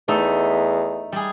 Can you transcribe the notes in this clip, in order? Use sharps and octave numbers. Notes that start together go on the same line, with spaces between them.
E2 A3 D#4 E5
G3 G#4